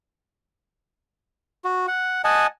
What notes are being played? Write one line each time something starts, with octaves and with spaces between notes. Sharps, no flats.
F#4
F#5
D#5 F#5 G#5 A5